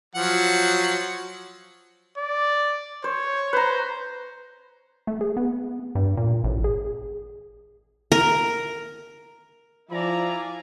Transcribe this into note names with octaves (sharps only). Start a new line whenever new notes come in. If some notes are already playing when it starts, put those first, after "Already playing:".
F3 F#3 F#5
D5
C5 C#5
B4 C5 A#5
A3
G#4
B3
G2
A#2
A1
G#4
A#4
F3 E4 D5 E5 F5 G#5 A#5